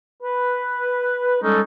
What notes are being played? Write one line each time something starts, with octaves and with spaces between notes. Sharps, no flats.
B4
G3 G#3 C#4 D#4 A4